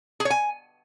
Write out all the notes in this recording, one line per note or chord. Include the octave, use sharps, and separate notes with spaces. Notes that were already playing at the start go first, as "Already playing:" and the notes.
G#4
C#5
G#5